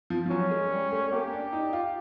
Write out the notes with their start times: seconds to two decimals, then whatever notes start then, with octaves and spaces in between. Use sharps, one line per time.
0.10 F3
0.26 F3
0.30 F#3 C#4
0.51 G#3
0.71 G3
0.91 A3
1.12 A#3 G4
1.33 D4
1.53 D#4
1.73 F4